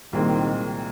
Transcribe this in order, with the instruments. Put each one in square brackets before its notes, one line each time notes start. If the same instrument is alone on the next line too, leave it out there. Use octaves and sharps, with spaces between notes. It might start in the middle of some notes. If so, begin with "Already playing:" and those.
[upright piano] C2 A#2 G#3 C4 [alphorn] D#3